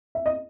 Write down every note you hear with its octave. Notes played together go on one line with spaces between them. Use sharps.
E5
D#5